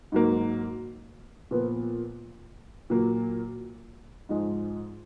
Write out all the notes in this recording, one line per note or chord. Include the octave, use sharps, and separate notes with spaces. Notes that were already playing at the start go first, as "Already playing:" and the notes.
G#2 F#3 A#3
A#2 F3 B3
A#2 F#3 A#3
G#2 F3 G#3